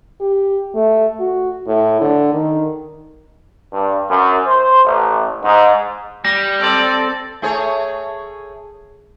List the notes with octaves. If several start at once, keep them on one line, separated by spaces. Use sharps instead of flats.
G4
A3
F#4
A2
D3
D#3
G2
F#2
C5
A1
G#2
G3 A#6
C4 A4 D5
A3 G#4 C#5